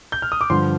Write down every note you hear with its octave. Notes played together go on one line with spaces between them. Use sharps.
G6
F6
D#6
D6
G2 D3 F3 C6